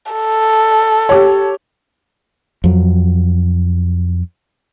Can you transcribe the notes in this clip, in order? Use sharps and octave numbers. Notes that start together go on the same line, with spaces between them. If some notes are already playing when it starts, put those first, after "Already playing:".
A4
G4 C#5
F2 F#3